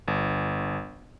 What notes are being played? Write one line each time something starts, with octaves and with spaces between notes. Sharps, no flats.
G1